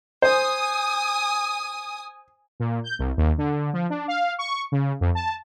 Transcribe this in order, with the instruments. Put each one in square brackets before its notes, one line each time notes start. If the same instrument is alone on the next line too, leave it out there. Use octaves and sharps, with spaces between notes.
[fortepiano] C5 [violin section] G#5 D#6
[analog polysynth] A#2
G6
C2
D#2
D3
F3
D4
F5
C#6
C#3
F2
A5